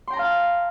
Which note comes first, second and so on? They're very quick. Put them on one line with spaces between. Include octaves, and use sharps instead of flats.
C6 G5 A#5 A5 F5